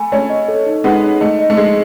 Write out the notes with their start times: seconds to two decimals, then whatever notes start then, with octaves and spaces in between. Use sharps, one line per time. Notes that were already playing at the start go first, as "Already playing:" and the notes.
Already playing: A3 G#5 B5
0.12 A3 C#4 G#5
0.30 D#5
0.48 A4
0.67 D#4
0.84 G#3 B3 D#4
1.03 D#4
1.21 A3 D#5
1.39 D#5
1.50 A3
1.57 G#3 D#5